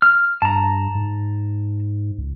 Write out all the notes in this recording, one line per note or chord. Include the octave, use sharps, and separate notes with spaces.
F6
G2 A5 A#5
G#2
C#2